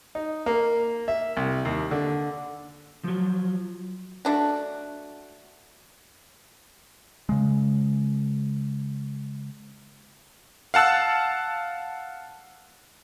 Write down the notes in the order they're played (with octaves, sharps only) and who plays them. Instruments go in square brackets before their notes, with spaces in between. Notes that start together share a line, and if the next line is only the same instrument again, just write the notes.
[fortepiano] D#4
A#3
E5
C2
D#2
D3
[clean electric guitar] F3 F#3
[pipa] A3 D4 F#4
[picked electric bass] C#3 G#3
[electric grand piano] F5 F#5 A5 E6 F#6